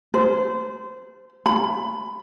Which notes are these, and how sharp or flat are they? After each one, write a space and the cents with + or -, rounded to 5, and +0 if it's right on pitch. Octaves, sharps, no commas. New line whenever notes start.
C5 -25
B5 +15